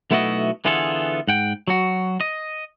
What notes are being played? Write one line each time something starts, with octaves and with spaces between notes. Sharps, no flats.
B1 A3 B3 E4 F#4 D#5
D3 E3 B3 F4 G#4 A4
G#2 F#5 G5
F#3 F#4
D#5